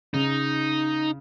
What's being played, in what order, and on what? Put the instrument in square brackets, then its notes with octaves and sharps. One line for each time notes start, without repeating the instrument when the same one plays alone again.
[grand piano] C#3 [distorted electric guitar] D#4